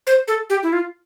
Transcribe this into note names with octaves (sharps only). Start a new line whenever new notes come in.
C5
A4
G4
E4
F4